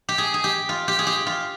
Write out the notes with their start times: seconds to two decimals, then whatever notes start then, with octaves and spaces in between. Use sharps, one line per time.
0.09 G4
0.18 G#4
0.34 G#4
0.44 G4
0.69 F4
0.88 G4
0.99 G#4
1.07 G4
1.27 F4